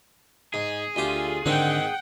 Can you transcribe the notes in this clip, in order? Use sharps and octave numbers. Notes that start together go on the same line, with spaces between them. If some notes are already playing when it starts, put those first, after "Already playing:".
G#2 G#4
D2 F4 G4
G#2 D3 D#3 C4 F#5 G5